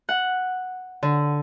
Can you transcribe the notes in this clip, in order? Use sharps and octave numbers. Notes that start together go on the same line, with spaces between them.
F#5
D3